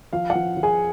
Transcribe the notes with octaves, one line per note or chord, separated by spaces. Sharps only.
F3 F5
F#5
F3
F3
G#4 G#5